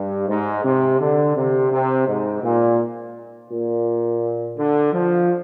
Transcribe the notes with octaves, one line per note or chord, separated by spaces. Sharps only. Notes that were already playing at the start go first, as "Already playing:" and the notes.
Already playing: G2
G#2
C3
D3
C3
C3
G#2
A#2
A#2
D3
F3